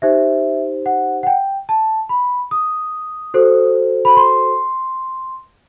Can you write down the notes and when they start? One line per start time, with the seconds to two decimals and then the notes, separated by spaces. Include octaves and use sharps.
0.02 D#4 G4 C5 E5
0.86 F#5
1.23 F#5
1.27 G5
1.69 A5
2.09 B5
2.51 D#6
3.34 F#4 A4 C5
4.05 B5
4.17 C6